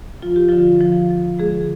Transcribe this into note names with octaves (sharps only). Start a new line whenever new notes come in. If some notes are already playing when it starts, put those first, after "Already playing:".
F3 F4
G4
D3 F3 F4
F3
F3
D3 G#3 G#4